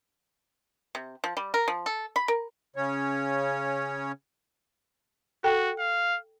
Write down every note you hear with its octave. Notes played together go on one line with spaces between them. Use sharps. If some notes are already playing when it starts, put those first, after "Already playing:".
C3
F3
G3
A#4
F3
A4
B5
A#4
C#3 C#4 C#5
F#4 A4 G5
F5